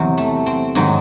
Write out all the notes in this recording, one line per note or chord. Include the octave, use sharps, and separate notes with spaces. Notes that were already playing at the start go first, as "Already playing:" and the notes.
Already playing: E2 C3 F#3 C4
A3
C4
G#2 D#3 F#3